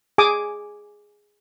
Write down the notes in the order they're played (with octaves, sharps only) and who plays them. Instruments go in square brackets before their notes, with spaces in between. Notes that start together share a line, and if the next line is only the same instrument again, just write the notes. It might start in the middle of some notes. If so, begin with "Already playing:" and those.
[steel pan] G#4 G#5 D6 D#6